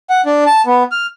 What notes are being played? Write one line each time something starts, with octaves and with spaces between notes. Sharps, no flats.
F#5
D4
A5
B3
F6